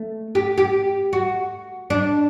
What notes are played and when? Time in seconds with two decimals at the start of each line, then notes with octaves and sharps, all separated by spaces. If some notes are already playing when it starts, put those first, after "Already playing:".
Already playing: A3
0.35 G4
0.58 G4
1.13 F#4
1.90 D4